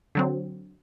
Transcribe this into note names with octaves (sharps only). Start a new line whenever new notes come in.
D3 F#3 C4